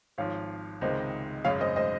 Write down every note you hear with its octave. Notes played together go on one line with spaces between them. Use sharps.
G#1 G#2 F3 C#5 F5
C#2 C3 D#3 G#3 C5 D#5
G#1 F#2 C#3 G#3 C#5 F5
C5 D#5
C5 D#5